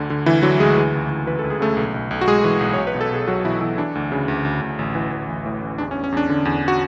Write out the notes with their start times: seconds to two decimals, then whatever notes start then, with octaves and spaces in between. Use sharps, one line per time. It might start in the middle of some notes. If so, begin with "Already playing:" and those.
Already playing: D2 D3
0.10 D3
0.26 D2 E3 E4
0.43 D3 F#3 F#4
0.60 D2 G#3 G#4
0.77 E3
0.94 C#2
1.10 E3
1.26 E3 B4
1.39 A4
1.44 C#2
1.50 G#4
1.61 C#3 A3 A4
1.77 B1
1.94 B1
2.11 B1
2.21 F#4
2.27 B1 G#3 G#4
2.44 E3
2.61 B1
2.73 B1 C#5
2.87 B4
2.95 B2
3.01 A4
3.11 B2 G#4
3.27 B1 F#3 F#4
3.44 B2 E3 E4
3.61 B2 E3 E4
3.78 E3 D4
3.95 D2
4.12 C#3
4.28 D2
4.45 D2
4.62 D2
4.79 A1
4.95 E3
5.12 A1
5.28 A1
5.46 A2
5.62 A1
5.78 E2 D4
5.91 C#4
5.95 E2
6.04 C#4
6.12 E2 D4
6.29 D3
6.45 E2
6.68 F#4